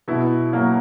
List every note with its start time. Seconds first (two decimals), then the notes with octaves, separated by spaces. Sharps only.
0.08 B2 E4
0.53 F#3 A#3